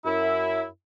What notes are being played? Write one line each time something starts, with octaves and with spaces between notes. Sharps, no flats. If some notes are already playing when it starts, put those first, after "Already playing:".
F#2 E4